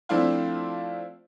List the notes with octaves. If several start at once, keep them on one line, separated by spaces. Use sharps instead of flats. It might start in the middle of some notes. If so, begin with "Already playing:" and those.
F3 A3 C4 D4 E4 F4